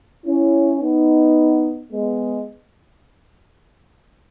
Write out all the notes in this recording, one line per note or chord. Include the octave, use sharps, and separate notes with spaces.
C#4 E4
B3 D#4
G#3 B3